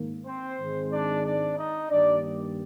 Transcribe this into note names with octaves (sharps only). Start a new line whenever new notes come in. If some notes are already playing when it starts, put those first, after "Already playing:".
Already playing: G#2 D#3 A#3
C4 C5
G#2 D#3 G#3 C4
D4 D5
D4 D5
D#4 D#5
G2 D#3 G3 A#3 D4 D5